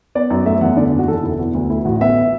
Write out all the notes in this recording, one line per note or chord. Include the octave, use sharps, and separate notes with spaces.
B3 D5
F#2
A3 E5
E2 F#5
D3 D5
F#1
F#4
E3 A4
E1 E4
B3 F#4
D2
A3 E4
A1 F#4
B3 E5